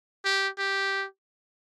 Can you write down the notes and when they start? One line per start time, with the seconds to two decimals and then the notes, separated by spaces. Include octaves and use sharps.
0.25 G4
0.58 G4